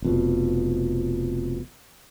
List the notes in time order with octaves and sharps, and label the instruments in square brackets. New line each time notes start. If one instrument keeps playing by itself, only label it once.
[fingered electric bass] F1 F2 B2